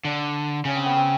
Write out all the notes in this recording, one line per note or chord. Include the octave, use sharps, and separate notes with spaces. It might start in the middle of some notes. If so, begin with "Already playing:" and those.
D3 D4
C#3 C#4
C4
B3
C4